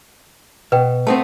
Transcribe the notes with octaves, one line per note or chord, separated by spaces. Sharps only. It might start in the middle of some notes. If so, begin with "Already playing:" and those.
B2 B4 G5
A3 B3 C4 A5